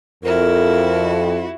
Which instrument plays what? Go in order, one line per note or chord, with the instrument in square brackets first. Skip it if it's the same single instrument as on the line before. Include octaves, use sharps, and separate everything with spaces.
[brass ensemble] F2 [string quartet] E4 F#4 [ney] A#4